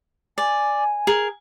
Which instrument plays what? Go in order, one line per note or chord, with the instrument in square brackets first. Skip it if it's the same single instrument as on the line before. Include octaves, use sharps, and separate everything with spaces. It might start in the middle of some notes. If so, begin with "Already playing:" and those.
[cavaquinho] D5 [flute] G#5
[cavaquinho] G#4 A#4